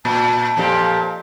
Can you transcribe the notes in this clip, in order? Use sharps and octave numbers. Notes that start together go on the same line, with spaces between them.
A#2 A5
F2 A#2 G4